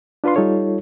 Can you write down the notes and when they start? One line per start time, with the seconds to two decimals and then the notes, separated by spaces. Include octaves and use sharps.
0.24 D4 F4 B4 F5 C6
0.36 G3 D#4 F4 A4 C#5